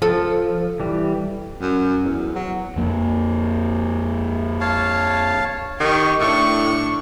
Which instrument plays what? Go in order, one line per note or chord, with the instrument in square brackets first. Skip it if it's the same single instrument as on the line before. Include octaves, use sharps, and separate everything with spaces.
[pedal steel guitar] F3 [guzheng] A4
[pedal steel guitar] E3 G3
[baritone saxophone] F#2
E2
F#3
[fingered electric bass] F2 A#3
[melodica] C#5 F5 A5
[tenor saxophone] D#3 [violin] G4 C#6
[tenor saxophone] A2 [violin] D4 C#6